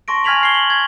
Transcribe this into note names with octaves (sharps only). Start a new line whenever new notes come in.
A5 C6 C#6 A#6 D7
G#5 F6 G#6 B6 F7 F#7
G#6 C7 G7
F#7
G#6